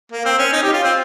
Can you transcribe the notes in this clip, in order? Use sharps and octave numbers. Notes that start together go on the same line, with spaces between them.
A#3
C4
C#4
D#4
G4
F4
C4